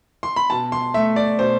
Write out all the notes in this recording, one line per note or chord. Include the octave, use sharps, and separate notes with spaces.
C6
B5
B2 A5
C6
A3 E5
D5
B2 C5